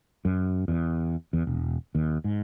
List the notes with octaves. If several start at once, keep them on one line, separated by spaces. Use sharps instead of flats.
F#2
E2
E2
E1
D#2
G#2